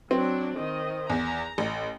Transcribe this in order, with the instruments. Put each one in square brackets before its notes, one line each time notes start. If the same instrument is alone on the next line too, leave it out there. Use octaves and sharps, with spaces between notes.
[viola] F#3 D4 [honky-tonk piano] C4
[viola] D#3 D#5
[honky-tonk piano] E2 [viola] A#5
[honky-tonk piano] A1